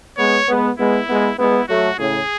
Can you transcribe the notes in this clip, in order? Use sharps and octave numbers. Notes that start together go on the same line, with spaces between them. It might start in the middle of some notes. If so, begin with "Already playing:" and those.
G#3 B3 C#5
G#3 B3
G#3 B3 E4
G#3 B3
G#3 B3 E4
F#3 A3 F#4
A2 C#3 G#4